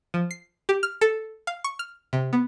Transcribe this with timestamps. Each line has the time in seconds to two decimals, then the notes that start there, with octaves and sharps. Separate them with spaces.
0.14 F3
0.31 C7
0.69 G4
0.83 F6
1.01 A4
1.47 F5
1.64 C#6
1.79 F6
2.13 C3
2.33 B3